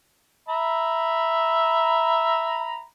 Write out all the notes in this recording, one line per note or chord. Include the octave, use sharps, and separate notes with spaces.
E5 A#5 B5